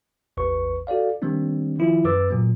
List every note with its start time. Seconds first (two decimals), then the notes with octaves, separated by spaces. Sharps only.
0.37 A1 E2 B4 C#6
0.87 F#4 A4 D5 F5
1.22 D#3 G3 A#3 C4 D4
1.79 D#3 F3 E4 F4
2.04 F#2 B4 D6 E6 A6
2.31 A#2 F#3 A#3